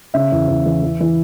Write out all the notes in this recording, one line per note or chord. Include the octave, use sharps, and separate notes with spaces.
C#3 E5
E2
E2
E3
E3
E3